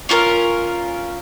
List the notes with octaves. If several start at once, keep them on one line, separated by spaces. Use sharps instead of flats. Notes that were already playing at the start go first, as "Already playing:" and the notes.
C#4 F4 A4 A#4